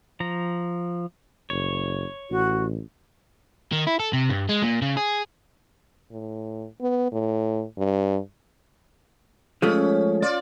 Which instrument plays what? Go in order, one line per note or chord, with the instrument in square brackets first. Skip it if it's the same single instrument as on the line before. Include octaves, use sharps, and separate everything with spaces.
[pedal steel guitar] F3 A#5
[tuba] F#1 [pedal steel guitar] C#5
[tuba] A1 [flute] F#4
[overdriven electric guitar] D#3
E4
A4
C3
G2
G#3
A#2
C#3
G#4
[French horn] A2
B3
A2
G2
[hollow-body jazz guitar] F3 G#3 A3 [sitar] C#4
[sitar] F4 D5